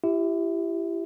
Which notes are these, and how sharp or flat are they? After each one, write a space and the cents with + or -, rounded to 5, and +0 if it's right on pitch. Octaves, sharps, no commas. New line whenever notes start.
E4 +35 G4 +0 E5 -15